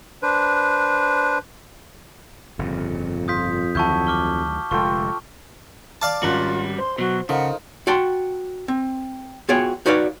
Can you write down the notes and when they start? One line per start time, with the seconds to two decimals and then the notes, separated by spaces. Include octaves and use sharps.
0.23 D4 B4 C5
2.59 G1 F2 A#2 C#3
3.28 F4 D#6 G6 B6
3.75 D2 D#3 F#3 E4 F#4 A5 C#6 G6
4.07 D6 F6 G7
4.71 F1 D3 G#3 F4 A4 G5 C#6
6.02 D5 F5 A5 D6
6.23 G#1 G3 C#4 F4 F#4 F#6
6.78 C5 C6
6.98 B2 F#3 F#4
7.29 C#3 F3 D#4 A4 A#4 F#5
7.87 F#4 G5 A5 C6
8.68 C4
9.49 B3 F4 F#4 G#4 C#5 G5
9.86 D#4 F#4 B4 C#5 D5 F5